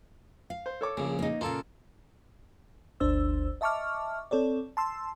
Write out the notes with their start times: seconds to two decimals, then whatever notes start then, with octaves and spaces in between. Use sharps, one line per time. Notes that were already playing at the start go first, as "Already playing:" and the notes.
0.50 F5
0.66 C5
0.81 A4 C#5 D6
0.97 A#1 C#3 A#3
1.19 A#3 D#4
1.41 A#2 C#3 A#3 F4 A4
3.00 G1 D2 D4 C5 E6
3.61 D#5 E5 A5 C#6 D6 F6
4.31 C4 A4 C#5 D5
4.77 A5 C6 E6